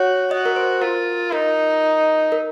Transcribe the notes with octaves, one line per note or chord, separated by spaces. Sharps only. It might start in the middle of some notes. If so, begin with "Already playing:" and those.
Already playing: F#4 C#5
F#4 D#5
A#4
C5
F4 A#4
D#4 A#4
A#4